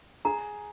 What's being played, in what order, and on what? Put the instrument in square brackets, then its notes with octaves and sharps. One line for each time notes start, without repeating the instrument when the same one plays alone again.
[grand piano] G#4 [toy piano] A#5